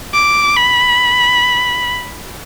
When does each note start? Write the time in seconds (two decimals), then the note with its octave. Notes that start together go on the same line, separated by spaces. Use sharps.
0.14 D6
0.57 B5